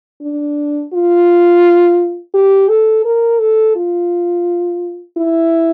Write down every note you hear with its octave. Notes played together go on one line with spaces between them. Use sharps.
D4
F4
G4
A4
A#4
A4
F4
E4